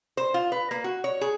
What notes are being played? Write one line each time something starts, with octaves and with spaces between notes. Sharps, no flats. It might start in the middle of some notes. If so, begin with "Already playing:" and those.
C5
F4
B4
A#3
F#4
C#5
G#4